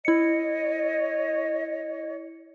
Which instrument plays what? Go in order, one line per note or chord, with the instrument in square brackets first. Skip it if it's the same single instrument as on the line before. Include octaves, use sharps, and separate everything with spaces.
[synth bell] E4 C#7 [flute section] C#5 D#5